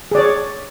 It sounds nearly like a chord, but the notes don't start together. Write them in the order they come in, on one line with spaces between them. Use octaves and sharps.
G#4 D5 C#5